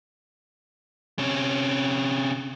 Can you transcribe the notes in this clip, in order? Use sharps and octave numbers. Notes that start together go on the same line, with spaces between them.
C3 C#4